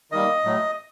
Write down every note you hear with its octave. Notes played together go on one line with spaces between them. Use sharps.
D#3 G3 A#3 D#5
A2 F#3 A3